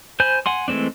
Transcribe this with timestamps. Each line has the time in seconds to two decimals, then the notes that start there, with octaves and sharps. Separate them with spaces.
0.20 C5 G#5 B5 G6
0.46 F#5 G#5 C6
0.68 E3 G#3 A3 C4 D4